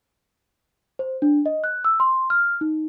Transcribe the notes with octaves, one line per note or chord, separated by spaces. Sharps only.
C5
D4
D#5
F#6
E6
C6
F6
D#4